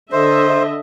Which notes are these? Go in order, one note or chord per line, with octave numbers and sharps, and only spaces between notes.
D3 C5 D#5 E5